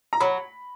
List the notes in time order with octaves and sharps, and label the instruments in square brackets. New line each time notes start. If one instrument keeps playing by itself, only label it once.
[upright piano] A#5
[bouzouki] F#3 [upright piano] B5